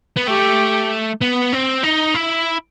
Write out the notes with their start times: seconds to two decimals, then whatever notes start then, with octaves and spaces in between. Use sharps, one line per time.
0.16 B3
0.27 A3 G4
1.21 B3
1.53 C4
1.84 D#4
2.15 E4